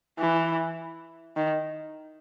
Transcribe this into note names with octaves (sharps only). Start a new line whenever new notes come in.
E3
D#3